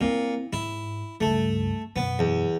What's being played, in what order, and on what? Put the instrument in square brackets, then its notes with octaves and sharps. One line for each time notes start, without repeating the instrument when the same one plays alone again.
[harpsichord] A#2 [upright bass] C4 E4
[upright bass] G#2 [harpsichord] E4
[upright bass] C#2 G2 [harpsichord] A3
[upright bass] F#2 B2 [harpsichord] B3
[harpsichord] E2